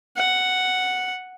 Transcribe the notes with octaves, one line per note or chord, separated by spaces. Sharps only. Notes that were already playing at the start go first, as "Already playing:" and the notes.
F#5